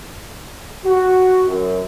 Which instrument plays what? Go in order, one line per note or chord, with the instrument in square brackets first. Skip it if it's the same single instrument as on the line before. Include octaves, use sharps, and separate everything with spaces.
[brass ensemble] F#4
F#2